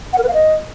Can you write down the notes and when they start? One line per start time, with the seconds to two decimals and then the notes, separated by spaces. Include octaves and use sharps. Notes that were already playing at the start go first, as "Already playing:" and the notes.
0.13 F#5
0.18 A#4
0.23 B4
0.28 F5
0.34 D#5